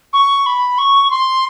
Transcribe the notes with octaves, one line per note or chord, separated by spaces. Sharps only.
C#6
B5
C#6
C6